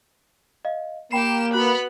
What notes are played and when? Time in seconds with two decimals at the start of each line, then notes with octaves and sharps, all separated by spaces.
0.65 D#5 F5
1.12 A#3 G4 G5 B5 C7 E7
1.53 B3 F#4 B5 F#6